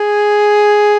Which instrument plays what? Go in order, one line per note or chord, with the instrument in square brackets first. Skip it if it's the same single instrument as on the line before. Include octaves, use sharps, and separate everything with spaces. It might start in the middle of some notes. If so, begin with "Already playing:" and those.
Already playing: [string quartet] G#4